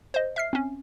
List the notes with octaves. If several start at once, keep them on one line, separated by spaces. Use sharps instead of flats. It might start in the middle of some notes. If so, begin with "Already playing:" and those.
C5 D#5
E5 F6 C7
C4 C#4